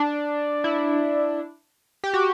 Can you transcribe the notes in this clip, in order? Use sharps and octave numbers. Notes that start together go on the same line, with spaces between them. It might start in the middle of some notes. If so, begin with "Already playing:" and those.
Already playing: D4
E4
G4
F#4